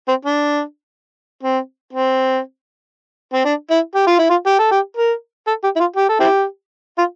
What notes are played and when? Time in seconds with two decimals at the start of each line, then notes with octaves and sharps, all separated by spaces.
0.08 C4
0.25 D4
1.43 C4
1.93 C4
3.33 C4
3.45 D4
3.71 E4
3.95 G4
4.07 F4
4.19 E4
4.30 F4
4.46 G4
4.59 A4
4.71 G4
4.97 A#4
5.47 A4
5.64 G4
5.76 E4
5.80 F4
5.97 G4
6.09 A4
6.20 C4 E4 G4
6.98 F4